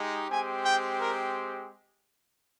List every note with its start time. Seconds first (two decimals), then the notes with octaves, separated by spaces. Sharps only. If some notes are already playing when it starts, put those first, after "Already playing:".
Already playing: G#3 D#4 G4
0.30 G#3 C4 G4 G#5
0.65 G5
1.01 A#4